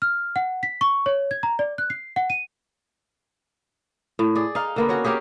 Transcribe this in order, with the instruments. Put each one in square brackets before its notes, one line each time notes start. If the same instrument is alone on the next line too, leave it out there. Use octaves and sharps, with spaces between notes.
[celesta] F6
F#5
B6
C#6
C#5
G#6
A#5
D5
F#6
C7
F#5
D#7
[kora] A2
G#4 D5
D#4 F5
D3 A#3 B3
C#4 F#4 C#5
A#3 C#4 G4 G#4